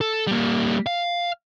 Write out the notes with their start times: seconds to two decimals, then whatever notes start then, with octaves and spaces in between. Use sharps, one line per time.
0.01 A4
0.27 G3 A#3
0.86 F5